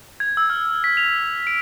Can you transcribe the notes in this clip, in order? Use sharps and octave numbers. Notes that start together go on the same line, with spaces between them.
G#6
E6
F6
B6
F7
D7